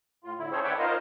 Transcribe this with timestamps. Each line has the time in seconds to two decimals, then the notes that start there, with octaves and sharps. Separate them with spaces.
0.24 A2 F4
0.39 A2 D3 E4
0.52 C4 C#4 G#4 A4 C5 C#5
0.63 B4 C#5 D5 E5 F#5 G5
0.79 D#4 F4 A#4 C5 D#5 F5